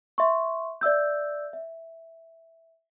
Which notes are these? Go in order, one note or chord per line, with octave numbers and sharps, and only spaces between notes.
E5 C6 C#6
D5 E5 E6 G6
E5